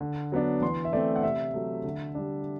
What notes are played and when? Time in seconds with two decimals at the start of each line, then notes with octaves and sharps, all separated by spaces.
0.01 D3
0.32 F#3 B3 D4
0.62 E3 C6
0.85 E5
0.93 A3 C4 D5
1.16 F#5
1.23 C3 E5
1.54 F#3 A3
1.84 D3
2.15 G3 D4